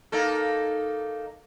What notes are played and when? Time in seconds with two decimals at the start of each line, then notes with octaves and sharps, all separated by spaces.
0.12 A#3 D#4 A4